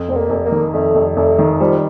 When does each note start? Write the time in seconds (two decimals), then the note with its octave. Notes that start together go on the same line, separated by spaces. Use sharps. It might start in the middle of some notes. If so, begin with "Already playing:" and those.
Already playing: F2
0.08 F1 C4
0.16 A#3
0.30 F1
0.45 A#3
0.52 D#3
0.74 F2 A3
0.95 F1
1.17 F1 A3
1.38 D#3
1.60 F3 G3